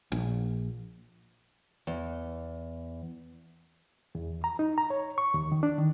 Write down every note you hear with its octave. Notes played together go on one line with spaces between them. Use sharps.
A#1
E2
E2
A#5
D#4
A#5
C#5
C#6
D#2
D#3
D4
D#3